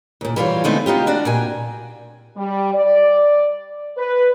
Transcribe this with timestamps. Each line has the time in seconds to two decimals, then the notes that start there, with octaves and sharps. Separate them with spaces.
0.21 D#2 A#2
0.36 E3 G3 F4 A4 C#5
0.64 D3 G#3 A3 B3 C4 D#4
0.86 B3 D#4 F4 G4
1.07 D4 F#4 D5
1.25 A#2 G5 G#5
2.37 G3
2.74 D5
3.98 B4